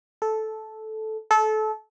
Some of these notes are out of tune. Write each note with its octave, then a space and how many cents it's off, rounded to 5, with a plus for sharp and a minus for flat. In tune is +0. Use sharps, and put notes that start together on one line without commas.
A4 -10
A4 -25